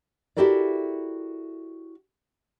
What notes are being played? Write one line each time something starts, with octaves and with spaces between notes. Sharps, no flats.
E4 F#4 G4 A4 A#4 D5